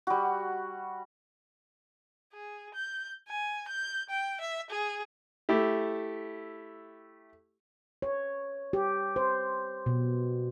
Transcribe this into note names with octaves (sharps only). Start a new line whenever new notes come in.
G3 F#4
G#4
G6
G#5
G6
G5
E5
G#4
A3 E4 G4
C#5
G4
C5
B2